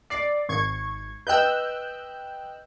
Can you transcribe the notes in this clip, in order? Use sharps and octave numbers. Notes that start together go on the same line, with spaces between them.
D5 C7
G#1 C#6 G#6
B4 D#5 G5 E6 F#6 G6